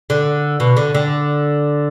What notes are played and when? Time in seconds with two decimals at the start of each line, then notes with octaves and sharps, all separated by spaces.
0.10 D3
0.60 B2
0.77 D3
0.94 D3